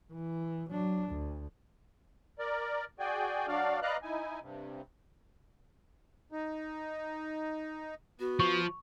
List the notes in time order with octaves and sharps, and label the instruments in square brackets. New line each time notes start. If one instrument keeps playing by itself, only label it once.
[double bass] E3
F#3 D4
D2
[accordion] A#4 D5
F#4 G#4 D5 G5 G#5
F#3 D4 F#4 D5 F5
B4 D5 D#5 F5 A#5 F#6
D#4 E4 G#5
G2 C3
D#4
[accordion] B3 [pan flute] F#4
[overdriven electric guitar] F3 [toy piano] C#6